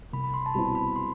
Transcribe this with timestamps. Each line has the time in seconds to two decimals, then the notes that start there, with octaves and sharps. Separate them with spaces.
0.13 C2 B5
0.24 B5
0.34 C6
0.46 A5
0.54 B2 G3 C4 E4 B5
0.75 B5
0.96 C6